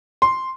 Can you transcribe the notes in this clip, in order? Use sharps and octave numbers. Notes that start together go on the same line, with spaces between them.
C6